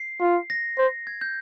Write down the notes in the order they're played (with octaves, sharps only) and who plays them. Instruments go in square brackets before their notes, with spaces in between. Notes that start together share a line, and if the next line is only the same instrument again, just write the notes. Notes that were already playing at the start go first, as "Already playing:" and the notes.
Already playing: [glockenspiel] C7
[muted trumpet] F4
[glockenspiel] A#6
[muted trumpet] C5
[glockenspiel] G#6
G6